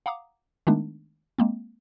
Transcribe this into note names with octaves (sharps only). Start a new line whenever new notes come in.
F5 F#5 A#5 D6 D#6
D#3 G#3 A3 B3 D4 D#4
G#3 A#3 C4